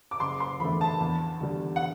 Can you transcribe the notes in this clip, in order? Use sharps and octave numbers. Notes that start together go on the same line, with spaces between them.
D6
F#1 C6
C6
E2 D3 A3 B5
A5
E2
D3 G3
F#5